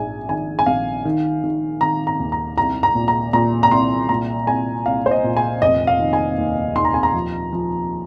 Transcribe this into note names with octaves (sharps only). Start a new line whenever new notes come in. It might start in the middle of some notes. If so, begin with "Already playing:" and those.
Already playing: A#1 G#2 G#5
D#3 G#5
G#5
A#1 F5
D#3
D#3
D#3 A#5
A#5
D#2
A#5
C2 A#5
A#5
A#2
A#5
A#2 A#5
A#5
C2 C6
A#2 A#5
C2 G#5
C2 F5
C5
D#5
A#2
G#5
F1 D#5
F5
D#3
G#5
D#2
D#2 C6
A#5
G#5
A#5
F3
F3